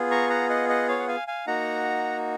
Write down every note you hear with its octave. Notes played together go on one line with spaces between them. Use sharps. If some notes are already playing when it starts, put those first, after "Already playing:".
Already playing: B3 F4 G#4
A#5 C#6
F#5 A#5
D#5 F#5
D#5 F#5
C#5 F5
F#5
F5 G#5
F5 G#5
A#3 D#4 F#4 F#5 A#5